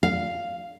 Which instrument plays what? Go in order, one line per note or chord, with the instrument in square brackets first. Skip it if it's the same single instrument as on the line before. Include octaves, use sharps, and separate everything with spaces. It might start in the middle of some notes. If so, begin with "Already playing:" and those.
[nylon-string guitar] F5